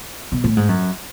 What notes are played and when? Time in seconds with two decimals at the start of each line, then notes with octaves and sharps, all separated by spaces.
0.32 B2
0.44 A2
0.57 G#2
0.69 F#2